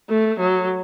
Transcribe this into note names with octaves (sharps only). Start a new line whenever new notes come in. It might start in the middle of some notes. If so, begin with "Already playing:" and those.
A3
F#3